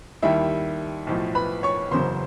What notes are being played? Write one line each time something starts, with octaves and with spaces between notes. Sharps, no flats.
D#2 D#3 G3 E4 E5
B1 A2 F3
B4 B5
C#5 C#6
F#1 E2 C#3 F#3 C5 C6